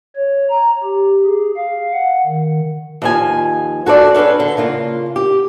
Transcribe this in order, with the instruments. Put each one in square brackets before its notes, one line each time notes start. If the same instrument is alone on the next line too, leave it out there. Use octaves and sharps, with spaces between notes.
[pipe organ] C#5
A#5
G4
G#4
F5
F#5
D#3
[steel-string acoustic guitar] D#2 F3 G#5
F#4 A4 C5 D5
C#4 D4 G#4 A4 B4
D3
C#3 A#3 F4
G4